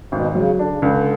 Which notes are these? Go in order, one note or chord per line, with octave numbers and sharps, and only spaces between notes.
G#1 B2
C#3 F#3
D3 D4
C#3
C#2 D3